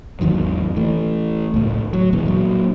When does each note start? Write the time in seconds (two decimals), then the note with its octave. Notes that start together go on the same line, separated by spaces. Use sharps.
0.21 G#1 E2 D#3 F#3
0.76 E3 A3
1.54 C#2 A2
1.93 F#3
2.13 F2 B2 E3 G#3
2.26 A#2 F#3